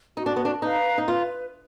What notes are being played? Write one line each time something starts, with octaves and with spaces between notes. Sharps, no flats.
D#4 F#4
D4
B3
D4
D#4 B4 F5 A#5
D#4
F4 B4